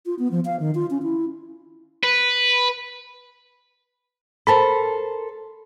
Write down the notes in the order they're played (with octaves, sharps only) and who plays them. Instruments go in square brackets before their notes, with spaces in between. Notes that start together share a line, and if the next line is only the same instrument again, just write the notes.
[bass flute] F4
B3
F3
F5
D#3
F4
C#4
E4
[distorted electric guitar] B4
[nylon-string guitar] A4 A#4 C5 [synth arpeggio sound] A5 B5